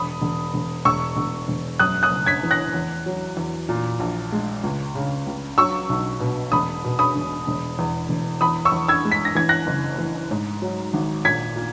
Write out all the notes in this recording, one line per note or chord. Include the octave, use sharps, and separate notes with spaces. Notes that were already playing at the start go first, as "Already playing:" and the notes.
Already playing: E1 B5 D#6
E1
E1
E1 C#6 E6
E1
E1
F#2 D#6 F#6
D#6 F#6
F#1
G#6 B6
E3
F#6 A#6
E2
F#3
E2
A#2
A#1
G#3
C#2
C#3
C#2
F#3 C#6 E6
B1
B2
E1 B5 D#6
B2
B5 D#6
E1
E1
E2
E1
E2 B5 D#6
C#6 E6
E2
E6 G#6
G#3
B6
A#6
E3 G#6
F#6 A#6
F#1
E3
G#2
F#3
G#1
A#2 G#6 B6
A#2